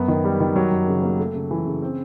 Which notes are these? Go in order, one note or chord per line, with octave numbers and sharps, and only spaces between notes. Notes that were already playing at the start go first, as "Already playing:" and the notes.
Already playing: F#2 B3
D#3
G3
D#3
F#3
F#2
C#3
A#3
A3
C#3
E3
C#3
C4